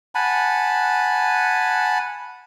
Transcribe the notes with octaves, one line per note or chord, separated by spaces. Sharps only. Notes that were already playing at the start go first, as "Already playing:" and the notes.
F#5 G#5 A5 B5